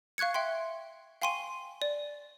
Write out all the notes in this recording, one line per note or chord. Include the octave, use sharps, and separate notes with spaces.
F5 C#6 F#6 G#6 C#7
E5 G5 C6
F5 G5 G#5 C6 C#6 D#7
D5